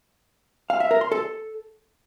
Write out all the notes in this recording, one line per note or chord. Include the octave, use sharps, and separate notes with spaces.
F5
E5
A#4
C6
A4